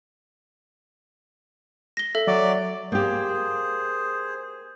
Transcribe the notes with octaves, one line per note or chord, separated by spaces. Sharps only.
A#6 G7
A4 E5
F#3 D5
A#3 G4 G#4 C5